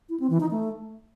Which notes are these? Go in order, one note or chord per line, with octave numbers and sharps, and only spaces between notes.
E4
C4
E3
D#4
A3